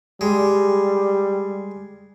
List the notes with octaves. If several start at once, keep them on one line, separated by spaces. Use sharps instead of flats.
G3 G#3